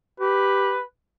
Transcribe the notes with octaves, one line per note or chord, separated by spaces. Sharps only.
G4 B4